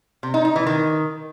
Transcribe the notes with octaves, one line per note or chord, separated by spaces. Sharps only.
C3
D#4
D#4
E3
D#3